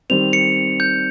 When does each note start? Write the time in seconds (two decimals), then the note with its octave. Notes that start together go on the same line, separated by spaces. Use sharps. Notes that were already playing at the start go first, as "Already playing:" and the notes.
0.10 D#3 G3 C4 F7
0.33 C#7
0.80 G6